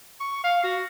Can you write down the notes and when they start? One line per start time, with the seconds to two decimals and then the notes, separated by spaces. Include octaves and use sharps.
0.20 C#6
0.44 F5
0.64 F#4